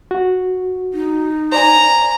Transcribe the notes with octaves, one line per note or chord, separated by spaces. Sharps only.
F#4
D#4
C5 D5 G#5 A#5